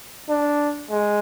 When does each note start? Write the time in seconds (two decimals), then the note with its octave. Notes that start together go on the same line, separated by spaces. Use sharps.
0.29 D4
0.90 G#3